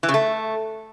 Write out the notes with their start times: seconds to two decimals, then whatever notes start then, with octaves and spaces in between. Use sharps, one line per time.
0.03 E3
0.09 C#3
0.14 A3